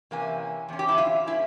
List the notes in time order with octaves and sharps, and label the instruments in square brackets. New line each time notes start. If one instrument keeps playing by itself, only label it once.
[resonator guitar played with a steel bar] C3 E3 A#3 C#4 G#5
E2 C3 C#4
G4
E4
F4
G3 A#3 C#4 E4